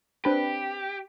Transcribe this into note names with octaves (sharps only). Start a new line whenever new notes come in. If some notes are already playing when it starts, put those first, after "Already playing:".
C4 D4 G4 B4